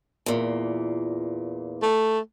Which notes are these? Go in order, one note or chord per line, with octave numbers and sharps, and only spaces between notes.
E2 A#2
A3